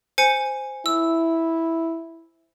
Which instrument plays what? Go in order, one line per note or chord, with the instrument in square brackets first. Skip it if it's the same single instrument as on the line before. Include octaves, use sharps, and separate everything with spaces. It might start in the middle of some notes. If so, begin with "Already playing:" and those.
[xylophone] C5 G#5 C#7
[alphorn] E4 [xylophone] E6